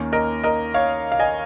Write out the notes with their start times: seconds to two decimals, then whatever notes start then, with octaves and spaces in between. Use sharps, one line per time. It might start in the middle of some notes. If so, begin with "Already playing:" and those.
Already playing: D#2 D#3 A#3 C#4
0.12 A#4 D#5
0.43 A#4 D#5
0.74 C#5 F5
1.12 F5
1.19 D#5 G#5